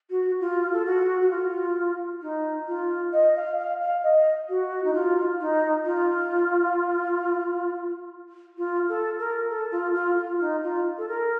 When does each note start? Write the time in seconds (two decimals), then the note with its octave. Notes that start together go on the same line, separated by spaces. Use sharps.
0.10 F#4
0.40 F4
0.73 A4
0.85 F#4
1.21 F#4
1.30 F4
2.21 D#4
2.67 F4
3.13 D#5
3.36 F5
3.58 F5
3.81 F5
4.03 D#5
4.49 F#4
4.84 D#4
4.94 F4
5.40 D#4
5.85 F4
8.57 F4
8.89 A4
9.18 A#4
9.49 A4
9.71 F4
9.94 F4
10.17 F4
10.40 D#4
10.63 F4
10.98 A4
11.08 A#4